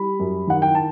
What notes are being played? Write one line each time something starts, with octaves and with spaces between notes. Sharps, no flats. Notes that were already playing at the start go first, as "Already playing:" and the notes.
Already playing: G3 B5
F#2
D#3 F#5
G5
A5